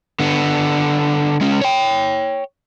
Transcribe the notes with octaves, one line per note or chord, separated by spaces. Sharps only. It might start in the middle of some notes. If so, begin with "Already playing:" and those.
D3 B3
G#3 C#4
C#5 G5